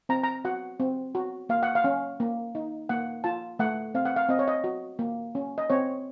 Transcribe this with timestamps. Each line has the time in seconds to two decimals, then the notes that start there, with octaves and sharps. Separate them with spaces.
0.09 C4 A#5
0.23 A#5
0.45 F#4 F#5
0.80 C4
1.15 F#4
1.49 A#3 F5
1.63 F#5
1.75 F5
1.84 C#4
2.20 A#3
2.55 D#4
2.89 A#3 F#5
3.24 F4 A5
3.59 A3 F#5
3.95 C4 F5
4.05 F#5
4.16 F5
4.29 C4 D#5
4.39 C#5
4.48 D#5
4.64 F#4
4.99 A#3
5.35 C#4
5.58 D#5
5.70 C4 C#5